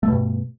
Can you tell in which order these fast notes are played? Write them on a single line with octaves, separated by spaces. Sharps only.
A3 B2 G2